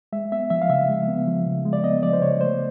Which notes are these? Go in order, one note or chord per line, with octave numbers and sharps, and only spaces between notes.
G#3 E5
B3 E5
F3 E5
F5
C#3 E5
G#3
B3
F3
C#3
G#3
D5
B3 D#5
F3 D5
C5
C#3 C#5
A3 C5